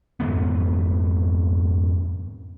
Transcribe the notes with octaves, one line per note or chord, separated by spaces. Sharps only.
F2 G#2 D3 B3